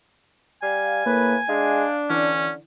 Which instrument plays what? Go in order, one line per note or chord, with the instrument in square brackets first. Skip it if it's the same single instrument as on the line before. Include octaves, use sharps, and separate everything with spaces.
[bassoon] G3 [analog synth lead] F5 [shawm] G#5
[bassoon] A2 [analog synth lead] A#3 [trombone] B4
[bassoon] G#3 [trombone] D4 [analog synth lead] F5
[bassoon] D3 [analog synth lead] E3 [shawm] C#4